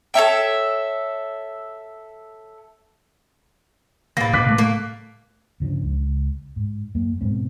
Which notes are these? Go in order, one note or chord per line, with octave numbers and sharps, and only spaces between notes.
A4 C#5 E5 G5
A2 A#3 B4 A6 A#6
B2 D6 F#6 B6
C#3 A3
A3 A#3
G1 C#3 F3 D4
C#2
G#2
F#2 A#3
G#2 B2 G#3 C4